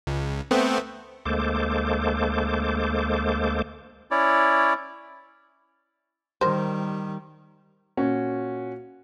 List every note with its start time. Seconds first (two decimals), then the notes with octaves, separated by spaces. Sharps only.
0.07 C#2
0.51 A3 B3 C4
1.26 D2 G#3 A#3 A4 C5 D6
4.11 C#4 E4 C#5 D5
6.41 D#3 G3 A#4 C5
7.97 A#2 C#4 F#4